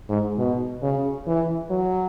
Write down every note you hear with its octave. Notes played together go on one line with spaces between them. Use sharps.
G#2
B2
C#3
E3
F#3